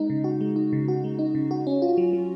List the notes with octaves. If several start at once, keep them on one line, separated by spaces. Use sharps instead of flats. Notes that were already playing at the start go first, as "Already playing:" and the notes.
Already playing: G#3 D#4
C#3
F#4
G#3
D#4
C#3
F#4
G#3
D#4
C#3
F#4
C#4
F4
F#3
F#3